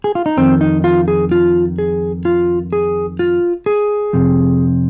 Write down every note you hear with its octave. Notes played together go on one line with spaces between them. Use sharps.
G#4
F4
D#4
F2 D#3 C4
D#4
F4
G#4
F4
G#4
F4
G#4
F4
G#4
F2 C3